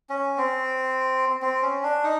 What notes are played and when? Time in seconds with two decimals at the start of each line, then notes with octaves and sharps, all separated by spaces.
0.09 C#4
0.38 C4
1.42 C4
1.62 C#4
1.83 D4
2.04 D#4